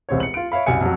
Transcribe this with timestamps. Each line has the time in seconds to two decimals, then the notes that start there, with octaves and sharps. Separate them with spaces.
0.09 E1 C2 C4 C#5
0.20 C#7 F#7
0.34 F4 D7
0.52 C#5 E5 F5 B5
0.66 C2 F#2 G#5 C#7
0.81 F2 F#3